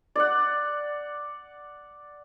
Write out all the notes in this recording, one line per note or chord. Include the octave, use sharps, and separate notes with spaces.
D5 F#5